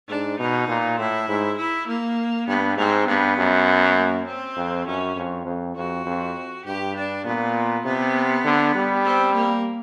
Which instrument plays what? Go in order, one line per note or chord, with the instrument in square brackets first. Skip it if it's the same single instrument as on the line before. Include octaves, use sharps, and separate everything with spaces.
[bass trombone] G#2 [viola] D4
[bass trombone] B2 [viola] D#4
[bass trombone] A#2
[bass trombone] A2 [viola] E4
[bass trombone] G#2
[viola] E4
A#3
[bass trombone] G2 [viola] B3
[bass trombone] G#2 [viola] C4
[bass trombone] G2 [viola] B3
[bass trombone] F#2
[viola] A#3
C4
[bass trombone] F2
[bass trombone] F#2 [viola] C#4
[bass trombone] F2
F2
[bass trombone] F2 [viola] F#4
[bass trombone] F2
[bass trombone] G2 [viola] G4
[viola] D4
[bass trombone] A#2 [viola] B3
[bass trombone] C3 [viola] B3
[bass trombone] D3
G3
[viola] C4
A#3